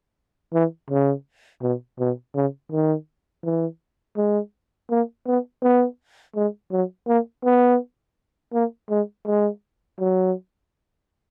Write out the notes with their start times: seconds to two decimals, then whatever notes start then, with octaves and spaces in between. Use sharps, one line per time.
0.54 E3
0.91 C#3
1.62 B2
2.00 B2
2.36 C#3
2.72 D#3
3.44 E3
4.17 G#3
4.91 A#3
5.27 B3
5.63 B3
6.36 G#3
6.72 F#3
7.08 A#3
7.45 B3
8.53 A#3
8.90 G#3
9.27 G#3
10.00 F#3